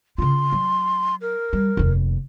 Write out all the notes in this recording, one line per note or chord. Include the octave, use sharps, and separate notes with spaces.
C#3 F4 C6
F#3
A#4
G3
F1 D#2